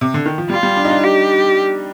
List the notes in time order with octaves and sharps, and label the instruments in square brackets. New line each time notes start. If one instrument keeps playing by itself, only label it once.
[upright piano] C3
D3
D#3
F3
[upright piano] G3 [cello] F4
[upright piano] G3
D4
D#4
D4
[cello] G4